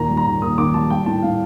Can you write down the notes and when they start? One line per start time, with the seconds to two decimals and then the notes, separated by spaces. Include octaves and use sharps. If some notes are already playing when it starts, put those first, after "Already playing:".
Already playing: D#2 A#2 A#5
0.10 G3
0.17 A#5
0.26 D#2
0.42 D#2 D#6
0.58 D#2 D6
0.74 G3 A5
0.90 G3 G5
1.06 A2 A5
1.22 A2 F5